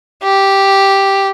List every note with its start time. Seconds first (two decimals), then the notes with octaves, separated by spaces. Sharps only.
0.24 G4